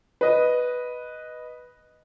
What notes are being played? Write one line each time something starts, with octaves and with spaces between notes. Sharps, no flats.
B4 D#5